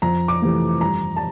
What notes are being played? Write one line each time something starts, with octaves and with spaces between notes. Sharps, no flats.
F2 A#5
D6
C3 E3 A3
G2 A#5
A5